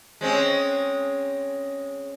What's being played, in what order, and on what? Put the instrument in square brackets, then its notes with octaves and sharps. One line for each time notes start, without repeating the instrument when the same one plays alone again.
[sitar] G#3 C4 C#4